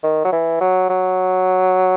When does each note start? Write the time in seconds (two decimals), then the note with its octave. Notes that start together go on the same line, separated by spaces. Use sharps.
0.04 D#3
0.25 F#3
0.32 E3
0.61 F#3
0.89 F#3